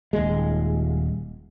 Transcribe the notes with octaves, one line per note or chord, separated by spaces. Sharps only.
D#1 G#3